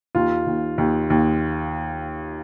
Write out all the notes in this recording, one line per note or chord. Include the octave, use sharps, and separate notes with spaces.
D#2 F4
D#2
D#2
D#2